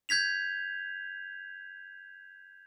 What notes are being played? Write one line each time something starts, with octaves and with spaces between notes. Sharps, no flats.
G6 G#6 B6 F7